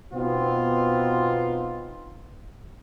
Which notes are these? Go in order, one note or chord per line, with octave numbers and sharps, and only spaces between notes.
B2 B3 C4 D#4 F4